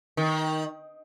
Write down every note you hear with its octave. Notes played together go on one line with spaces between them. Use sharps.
D#3